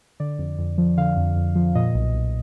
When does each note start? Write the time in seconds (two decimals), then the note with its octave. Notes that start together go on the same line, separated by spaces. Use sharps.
0.20 D3 D5
0.39 F2
0.58 F2
0.78 F3
0.97 D3 F5
1.17 F2
1.36 F2
1.55 F3
1.75 A#2 D#5
1.94 B1
2.13 B1